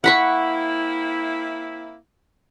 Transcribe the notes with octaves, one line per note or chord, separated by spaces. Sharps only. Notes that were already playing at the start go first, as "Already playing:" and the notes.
A#3 C4 E4 F#5 B5 C#6